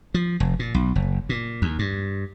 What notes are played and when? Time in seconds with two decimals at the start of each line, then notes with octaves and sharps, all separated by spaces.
0.14 F3
0.40 F1
0.59 A#2
0.74 B1
0.96 F#1
1.29 A#2
1.62 D#2
1.79 G2